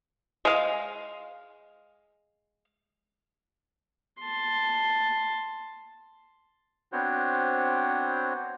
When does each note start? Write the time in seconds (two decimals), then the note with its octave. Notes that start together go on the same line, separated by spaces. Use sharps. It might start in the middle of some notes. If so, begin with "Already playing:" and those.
0.45 G#3 F5
4.21 A5 C6
6.92 B3 C4 D4 F#4 C5 C#5